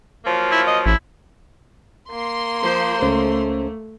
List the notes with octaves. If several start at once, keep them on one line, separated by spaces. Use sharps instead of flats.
F3 F#3 A#3
E4
D#5
A1 E4
A#3 C6
F3 C5
C#2 A3 C#4 C5